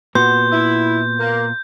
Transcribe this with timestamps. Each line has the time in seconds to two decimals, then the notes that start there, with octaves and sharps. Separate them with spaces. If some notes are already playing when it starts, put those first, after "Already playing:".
0.15 A#2 B3 F#4 C6 G6
0.51 E4
1.18 A#3